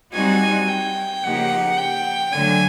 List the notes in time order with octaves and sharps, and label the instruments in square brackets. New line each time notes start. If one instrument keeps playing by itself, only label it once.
[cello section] G3 C4 D#4 F#4 [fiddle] G#5
[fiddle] G5
[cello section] C#3 F3 A#3 D#4 G4 [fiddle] F#5
[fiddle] G5
[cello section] D3 F#3 A3 [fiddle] G#5